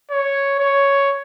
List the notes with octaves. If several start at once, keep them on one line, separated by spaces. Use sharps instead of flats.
C#5
C#5